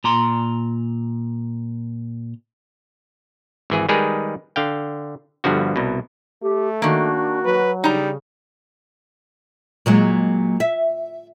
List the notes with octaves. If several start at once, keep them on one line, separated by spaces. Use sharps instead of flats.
A#2 A#5 C6
G#1 E3 G#4
D#3 G3 G#3 G#4 A#4 B4
D3 F5 G5
G1 G2 D3 F3 F#4
C2 B2
A3 G4
D#3 A#3 D4 F#4
F#3 B4
C#3 G3 D#4 A#5
A#2 F#3 G#3
E5